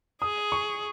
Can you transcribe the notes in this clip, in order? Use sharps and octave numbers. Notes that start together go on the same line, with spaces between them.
G#4 D#6
C#6